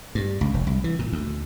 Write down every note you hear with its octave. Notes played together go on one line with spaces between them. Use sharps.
G2
C#2
F1
C2
E3
A#2
D2